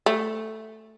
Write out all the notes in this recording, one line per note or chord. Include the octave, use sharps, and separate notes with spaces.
A3